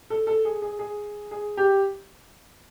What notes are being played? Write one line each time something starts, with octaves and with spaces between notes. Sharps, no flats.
A4
A4
G#4
G#4
G#4
G#4
G4